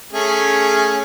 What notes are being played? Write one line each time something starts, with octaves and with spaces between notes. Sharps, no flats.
A3 C#4 G#4